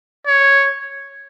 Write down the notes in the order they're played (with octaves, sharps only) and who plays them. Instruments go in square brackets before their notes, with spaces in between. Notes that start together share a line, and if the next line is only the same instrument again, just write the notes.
[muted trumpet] C#5